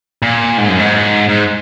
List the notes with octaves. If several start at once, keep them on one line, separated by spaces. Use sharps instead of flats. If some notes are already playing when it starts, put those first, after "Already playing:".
A#2
G#2
F#2
G#2
G#2